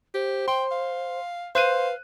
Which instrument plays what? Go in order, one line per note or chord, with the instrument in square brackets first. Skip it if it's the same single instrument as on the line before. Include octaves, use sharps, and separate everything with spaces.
[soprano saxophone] G4 [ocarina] C5
[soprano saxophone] G5 [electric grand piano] C6
[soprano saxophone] F5
[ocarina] B4 [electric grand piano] C5 F#6 D#7 [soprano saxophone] F5